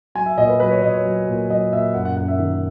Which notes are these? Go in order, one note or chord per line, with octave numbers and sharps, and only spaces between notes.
F#3 G#5
E5
A#2 D#5
B4
F#3 B4
C#5
A#2 D#5
C#5
F#3
A#2
F#3 D#5
A#2 E5
F#2 F#5
F#5
F#2 F#5
E5
D#3